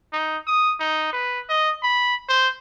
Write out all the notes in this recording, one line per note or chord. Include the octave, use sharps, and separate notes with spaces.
D#4
D#6
D#4
B4
D#5
B5
C5